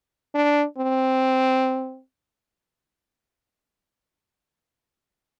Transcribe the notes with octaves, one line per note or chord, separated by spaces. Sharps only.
D4
C4